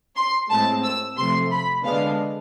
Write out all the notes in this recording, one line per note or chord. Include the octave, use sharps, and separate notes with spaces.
C6
A2 G#3 C4 A5
E6
C3 F3 A3 C6
B5
D3 G#3 B3 D4 F5